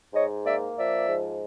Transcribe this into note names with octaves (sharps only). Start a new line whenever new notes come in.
G#2 C#5 D#5
A#3 D5 E5
F3 D5 E5
G#2